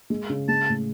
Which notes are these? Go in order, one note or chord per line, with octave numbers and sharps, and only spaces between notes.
G#3
C#3
G#3 A5
A2